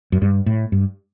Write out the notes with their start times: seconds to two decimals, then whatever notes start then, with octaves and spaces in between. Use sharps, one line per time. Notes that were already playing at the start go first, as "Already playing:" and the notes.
0.12 F#2
0.22 G2
0.46 A2
0.72 G2